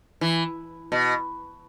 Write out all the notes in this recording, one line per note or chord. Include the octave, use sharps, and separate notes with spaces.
E3
B2